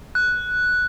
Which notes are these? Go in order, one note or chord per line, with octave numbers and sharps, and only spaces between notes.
F#6